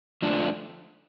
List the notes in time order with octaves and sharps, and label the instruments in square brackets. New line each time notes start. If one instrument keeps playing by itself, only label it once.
[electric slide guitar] F2 D3 F3 A3 D4